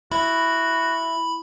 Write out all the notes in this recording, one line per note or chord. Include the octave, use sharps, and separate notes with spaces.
E4 F#4 B5